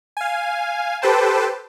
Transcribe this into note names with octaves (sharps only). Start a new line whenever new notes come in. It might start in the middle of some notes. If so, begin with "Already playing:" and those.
F5 G#5
G4 A4 B4 C5 G5 A5